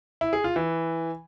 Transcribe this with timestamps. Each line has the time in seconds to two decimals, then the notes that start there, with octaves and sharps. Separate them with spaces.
0.21 E4
0.33 G#4
0.44 F4
0.56 E3